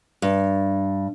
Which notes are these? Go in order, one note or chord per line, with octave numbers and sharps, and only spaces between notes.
G2